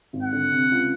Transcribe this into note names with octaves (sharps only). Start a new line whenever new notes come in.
G#1
F#5
D3
C3
C#2